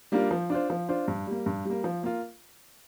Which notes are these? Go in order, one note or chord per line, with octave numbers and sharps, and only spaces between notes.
G3 A#3 D4 F4
F3
D4 F4 C5
F3
D4 F4 C5
G2
G3 A#3
G2
G3 A#3
F3
A#3 F4